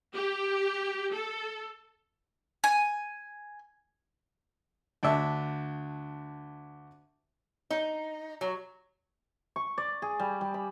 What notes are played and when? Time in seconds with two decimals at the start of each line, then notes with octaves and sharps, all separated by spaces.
0.15 G4
1.13 A4
2.64 G#5
5.03 D2 D4 E5
7.71 D#4
8.41 F#3
9.56 C#6
9.78 D5
10.02 G#4
10.20 G3
10.41 G3
10.54 B5